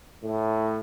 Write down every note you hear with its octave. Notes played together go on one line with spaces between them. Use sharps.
A2